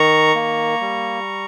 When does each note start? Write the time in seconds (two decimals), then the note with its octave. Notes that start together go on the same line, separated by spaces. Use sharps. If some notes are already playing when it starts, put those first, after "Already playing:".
Already playing: D#3 A#5 C#6
0.35 A#3
0.81 G3